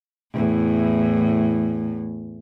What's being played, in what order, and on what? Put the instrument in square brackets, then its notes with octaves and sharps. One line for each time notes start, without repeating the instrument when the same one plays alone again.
[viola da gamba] E2 A2